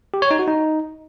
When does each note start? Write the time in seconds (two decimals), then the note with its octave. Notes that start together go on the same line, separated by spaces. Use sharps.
0.14 G4
0.22 C#5
0.31 D#4
0.39 F#4
0.48 D#4